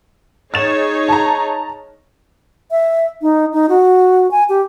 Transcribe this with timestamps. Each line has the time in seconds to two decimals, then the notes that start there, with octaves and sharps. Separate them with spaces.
0.54 D#4 G#4 C#5 A6 E7
1.08 A5 A#5
2.71 E5
3.22 D#4
3.53 D#4
3.69 F#4
4.31 G#5
4.49 G4